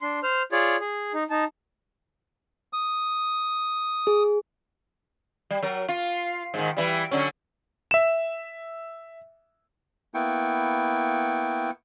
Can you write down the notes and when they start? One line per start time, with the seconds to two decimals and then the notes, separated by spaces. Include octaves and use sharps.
0.01 D4 C6
0.23 C5 F6
0.52 F4 G#4 C#5 D5
0.80 G#4
1.14 D#4
1.30 D#4 A5
2.73 D#6
4.07 G#4
5.50 G3
5.63 F#3 A#4
5.88 F4
6.54 G#2 D#3
6.77 E3 G3
7.11 D3 F#3 C#4
7.91 E5 E7
10.14 A#3 B3 E4 G5 C#6